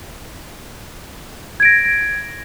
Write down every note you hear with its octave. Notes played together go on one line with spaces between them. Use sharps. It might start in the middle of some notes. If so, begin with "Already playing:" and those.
G#6 A#6 D7